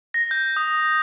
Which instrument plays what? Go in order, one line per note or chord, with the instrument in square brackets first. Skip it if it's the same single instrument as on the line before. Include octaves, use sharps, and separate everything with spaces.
[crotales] A#6
G6
D#6